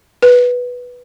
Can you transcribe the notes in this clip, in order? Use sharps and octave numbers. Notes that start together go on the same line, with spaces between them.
B4